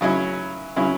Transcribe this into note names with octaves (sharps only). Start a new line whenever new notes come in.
C#3 F#3 C#4 E4
C#3 F#3 C#4 E4